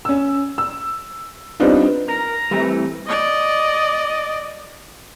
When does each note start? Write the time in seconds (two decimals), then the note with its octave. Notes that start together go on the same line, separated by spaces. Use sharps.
0.05 C#4 E6
0.58 E6
1.60 G3 B3 C4 D4 D#4 F4
2.08 A#4 A#5
2.51 E3 G3 A3 C4
3.06 D5 D#5